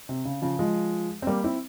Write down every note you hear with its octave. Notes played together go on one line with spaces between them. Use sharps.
C3
C#3
C#3 F3
F3 G#3
C4
G3 A#3
C4 E4